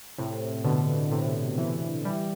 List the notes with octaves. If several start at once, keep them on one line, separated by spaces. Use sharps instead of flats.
A2 C3
B2 D3
A2 C3
C3 E3
E3 G3